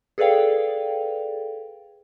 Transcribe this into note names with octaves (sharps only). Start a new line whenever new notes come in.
G#4 A4 B4 D5 F5 G5